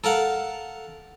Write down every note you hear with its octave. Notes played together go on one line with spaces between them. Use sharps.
A4 A#4 F5 F#5